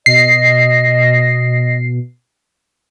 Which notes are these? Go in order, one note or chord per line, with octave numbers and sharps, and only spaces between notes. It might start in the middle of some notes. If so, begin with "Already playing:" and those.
B2 D#5 C7